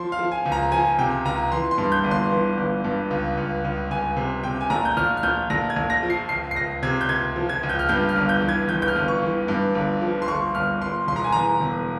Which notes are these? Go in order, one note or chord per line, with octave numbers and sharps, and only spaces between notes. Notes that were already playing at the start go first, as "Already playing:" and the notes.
Already playing: F3 C6
F5
F3
G#5
C#2
A#5
F3 G#5
C3 G5
C#2 A#5
E3 C6
C6
G2
G6
G1
C6
E3
G1
G2
C#2
C#2
C#2
C#2 G#5
C3
C3 G5
G#5
A#1 A#5
G6
A#1 F6
F6
A#1 G6
A#1 A#6
G#6
A#1
A#6
F3
C7
C#2 C7
C7
C#2 A#6
C3 G#6
G6
C#2 G#6
F3
G#6
C#2
G6
F6
G2 G6
F6
G1
G6
E3
G#6
E3 G6
G6
F6
G1
C#6
E3
G2
G1
F3
C6
G1 C#6
G1 F6
G1 C6
E1 C6
A#5
G#5
E3 A#5
E1